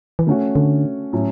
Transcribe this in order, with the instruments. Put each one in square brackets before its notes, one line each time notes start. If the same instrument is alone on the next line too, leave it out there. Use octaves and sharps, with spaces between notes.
[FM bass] E3
[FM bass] D3 [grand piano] A3 C#4 F#4
[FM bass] D3
[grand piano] A2 F#3 C#4